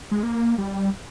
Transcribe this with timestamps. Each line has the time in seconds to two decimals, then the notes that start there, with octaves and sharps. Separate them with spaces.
0.11 G#3
0.23 A#3
0.58 G3